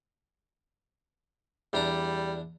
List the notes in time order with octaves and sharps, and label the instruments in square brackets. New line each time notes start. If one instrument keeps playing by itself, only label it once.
[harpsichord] E2 D4 A#5 [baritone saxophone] G3